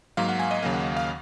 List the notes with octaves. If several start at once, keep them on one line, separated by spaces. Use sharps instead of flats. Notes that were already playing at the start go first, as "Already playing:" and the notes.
G#2 F#3 A#3 F5
F#5
G#5
D#5
D#2 C#3 F#3 A#3 F5
F#5
F5